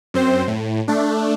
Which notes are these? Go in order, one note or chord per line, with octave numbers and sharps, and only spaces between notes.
F#2 C4 C5
A2
A3 D4